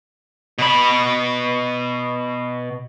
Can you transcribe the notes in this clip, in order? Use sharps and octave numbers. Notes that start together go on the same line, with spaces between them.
B2 B5